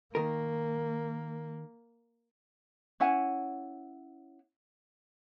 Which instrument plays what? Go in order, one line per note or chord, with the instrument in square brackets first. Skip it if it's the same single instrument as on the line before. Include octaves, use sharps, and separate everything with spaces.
[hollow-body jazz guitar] D#3 A#4 [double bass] A#3
[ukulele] C#4 E4 F#5 G#5